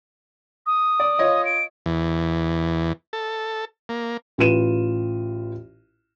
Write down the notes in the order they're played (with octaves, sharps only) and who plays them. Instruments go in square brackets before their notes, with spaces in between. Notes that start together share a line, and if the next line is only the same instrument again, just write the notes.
[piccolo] D#6
[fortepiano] D5
F4 C#5 D#5
[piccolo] D7
[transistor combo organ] E2
A4
A#3
[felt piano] A1 F4 B4 D#7 E7